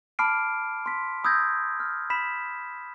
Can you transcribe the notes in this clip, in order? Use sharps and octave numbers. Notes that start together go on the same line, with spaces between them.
A5 B5 D6 F6 C7 D7
C6 B6
B5 D#6 E6 G6 G#6 A#6
F6
B5 B6 E7